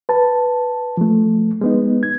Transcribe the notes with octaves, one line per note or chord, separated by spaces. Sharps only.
B4 A5
F3 A3
G#3 B3 D#4
G#6